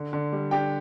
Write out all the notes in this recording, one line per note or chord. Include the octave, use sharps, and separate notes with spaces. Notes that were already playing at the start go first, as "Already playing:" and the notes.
Already playing: D3
D3
G3
D4 G4 G5